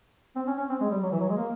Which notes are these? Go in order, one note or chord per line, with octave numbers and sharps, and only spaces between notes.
C4
C#4
C#4
C4
G#3
G3
F#3
E3
F#3
G#3
A#3